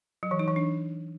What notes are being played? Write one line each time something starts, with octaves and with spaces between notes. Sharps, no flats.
F#3
E3
D#4
E3
D4